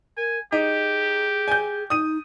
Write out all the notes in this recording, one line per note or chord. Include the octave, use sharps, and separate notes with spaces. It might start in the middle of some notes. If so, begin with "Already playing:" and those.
A#4 G#5
D#4 G4 G#4
G#5 G6
D#4 D#6 D#7